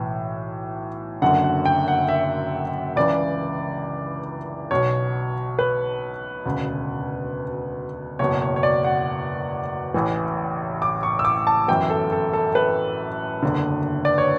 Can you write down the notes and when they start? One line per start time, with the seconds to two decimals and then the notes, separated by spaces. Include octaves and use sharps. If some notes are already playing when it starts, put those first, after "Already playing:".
Already playing: B1 A2 E3
1.22 F#1 F#2 D3 F#5
1.44 F#5
1.66 G5
1.88 F#5
2.09 E5
2.96 C#2 C#3 E3 D5
4.71 B1 B2 C#5
5.59 B4
6.45 E1 D2 C#3
8.19 F#1 E2 B2 C#5
8.42 C#5
8.56 C#5
8.63 D5
8.84 F#5
9.94 A1 A2 E3
10.82 D6
11.03 C#6
11.19 E6
11.25 D6
11.47 A5
11.68 G1 F#2 E3 G5
11.90 A4
12.12 A4
12.33 A4
12.55 B4
13.43 F#1 E2 D3
14.05 D5
14.18 C#5